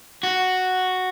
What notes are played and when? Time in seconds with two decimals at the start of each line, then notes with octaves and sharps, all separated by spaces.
0.23 F#4